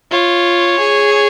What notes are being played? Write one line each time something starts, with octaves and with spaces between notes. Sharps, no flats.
F4 C#5
G#4